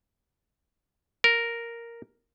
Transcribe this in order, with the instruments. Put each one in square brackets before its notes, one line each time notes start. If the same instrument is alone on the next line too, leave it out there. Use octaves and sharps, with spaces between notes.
[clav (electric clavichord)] A#4